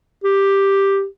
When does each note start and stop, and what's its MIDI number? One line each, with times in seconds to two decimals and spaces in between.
0.24 1.06 67